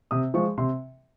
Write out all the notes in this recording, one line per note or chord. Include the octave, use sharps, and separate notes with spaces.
C3 D#6
F3 G#3 C#6
C3 C6